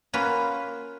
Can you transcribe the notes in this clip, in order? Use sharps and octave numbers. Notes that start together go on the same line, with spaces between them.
A#3 C#4 F4 F#4 B4